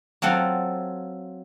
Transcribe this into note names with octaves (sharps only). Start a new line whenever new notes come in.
F#3 C4 F4 A4 F#5